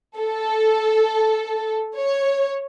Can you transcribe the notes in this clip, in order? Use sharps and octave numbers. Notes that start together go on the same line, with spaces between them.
A4
C#5